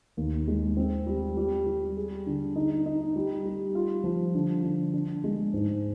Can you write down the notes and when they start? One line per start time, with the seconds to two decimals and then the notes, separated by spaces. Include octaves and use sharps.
0.17 D#2
0.48 G#3
0.77 C4
1.06 G3
1.37 G3
1.66 G3
1.97 G#4
2.27 D3
2.56 D#4
2.86 D#4
3.16 G3
3.45 G3
3.75 F4
4.04 F3
4.35 D3
4.63 D3
4.93 D4
5.24 G#3
5.53 G#2